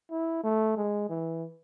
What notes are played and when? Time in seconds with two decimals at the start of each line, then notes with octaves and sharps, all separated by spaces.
0.11 E4
0.44 A3
0.77 G#3
1.10 E3